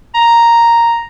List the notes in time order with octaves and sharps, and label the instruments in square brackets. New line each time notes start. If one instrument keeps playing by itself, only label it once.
[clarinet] A#5